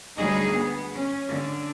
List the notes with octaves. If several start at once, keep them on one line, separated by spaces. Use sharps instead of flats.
D2 F#3 G3 D#4 G#4
B3
C#4
D3